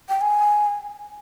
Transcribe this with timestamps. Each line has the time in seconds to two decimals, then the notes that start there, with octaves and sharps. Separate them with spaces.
0.09 G5
0.21 G#5